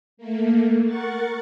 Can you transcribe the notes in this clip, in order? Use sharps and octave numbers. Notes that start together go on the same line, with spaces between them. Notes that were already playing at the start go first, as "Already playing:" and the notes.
A3 A#3
A#4 F#5 C#6 A6